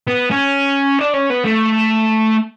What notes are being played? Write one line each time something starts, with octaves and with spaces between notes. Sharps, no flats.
B3
C#4
D4
C#4
B3
A3